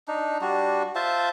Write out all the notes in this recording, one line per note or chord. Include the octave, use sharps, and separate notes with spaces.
D4 D#4
G3 D4 F#4
F4 C5 E5 A5